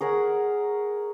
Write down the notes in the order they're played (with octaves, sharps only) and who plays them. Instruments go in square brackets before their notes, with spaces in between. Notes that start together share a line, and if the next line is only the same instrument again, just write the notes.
[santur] G#4 A#4 C#5 F#5